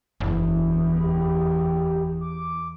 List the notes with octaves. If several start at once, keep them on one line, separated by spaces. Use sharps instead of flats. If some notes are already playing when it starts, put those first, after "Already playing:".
F#1 E2 E3
G4
D6